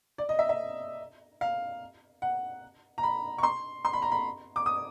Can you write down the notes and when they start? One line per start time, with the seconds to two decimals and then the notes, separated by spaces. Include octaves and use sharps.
0.18 D5
0.29 D#5
0.39 E5
0.49 E5
1.41 F5
2.22 F#5
2.98 A#5
3.03 B5
3.38 C#6
3.43 C6
3.85 C6
3.93 B5
4.02 A#5
4.12 B5
4.56 D6
4.66 D#6